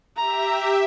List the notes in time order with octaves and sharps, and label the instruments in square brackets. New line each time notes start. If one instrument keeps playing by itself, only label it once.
[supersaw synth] G4 E5 [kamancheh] A#5